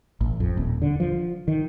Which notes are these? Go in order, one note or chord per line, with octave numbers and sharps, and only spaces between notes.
A1
F2
D#1
D3
F3
D#3